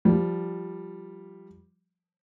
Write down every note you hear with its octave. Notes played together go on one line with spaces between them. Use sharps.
F3 G3